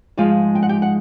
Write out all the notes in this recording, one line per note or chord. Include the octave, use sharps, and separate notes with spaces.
G#2 F3 G#3 F4 F5
G5
F#5
G4 G5
F#5